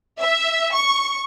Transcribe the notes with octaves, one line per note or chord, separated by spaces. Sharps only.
E5
C#6